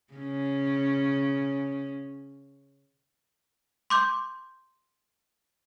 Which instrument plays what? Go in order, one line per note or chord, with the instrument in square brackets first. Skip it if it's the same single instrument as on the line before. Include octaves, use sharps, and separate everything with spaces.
[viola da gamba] C#3 C#4
[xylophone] C6 D6 G6